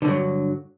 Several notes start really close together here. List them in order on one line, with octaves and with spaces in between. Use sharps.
D3 G2 F#3